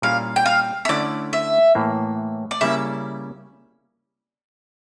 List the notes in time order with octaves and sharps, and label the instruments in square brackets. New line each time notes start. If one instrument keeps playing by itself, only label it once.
[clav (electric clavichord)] A#2 G3 A#3 C#4 E4 [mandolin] F5
[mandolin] G5
F5
E5
[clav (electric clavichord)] D3 A3 C#4 E4 [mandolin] D5
[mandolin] E5
[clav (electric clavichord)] A2 E3 A#3
[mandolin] D5
[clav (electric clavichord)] C#3 G3 A#3 C#4 E4 [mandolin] E5